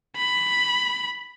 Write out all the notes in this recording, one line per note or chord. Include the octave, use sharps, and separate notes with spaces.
B5